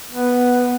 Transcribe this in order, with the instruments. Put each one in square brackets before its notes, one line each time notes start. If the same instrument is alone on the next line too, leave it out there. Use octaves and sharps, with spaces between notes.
[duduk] B3